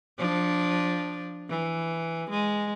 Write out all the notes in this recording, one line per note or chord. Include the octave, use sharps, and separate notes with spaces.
F3 D4
E3
G#3